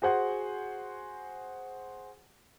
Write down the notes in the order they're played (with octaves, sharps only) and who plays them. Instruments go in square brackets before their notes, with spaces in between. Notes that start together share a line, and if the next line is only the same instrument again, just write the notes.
[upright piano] F#4 G#4 C5 F#5 G#5